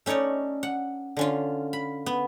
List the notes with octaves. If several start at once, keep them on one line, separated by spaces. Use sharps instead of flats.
A3 C#4 D#4 C#5 D5
F#5
D3 C#4 F4
B5
B3